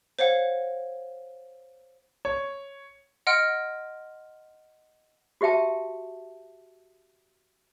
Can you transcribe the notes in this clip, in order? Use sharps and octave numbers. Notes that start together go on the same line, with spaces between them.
C5 C#5 F5 F#5
C#5
D#5 F#5 C6 F6 D7
F#4 G4 E5 G5 A5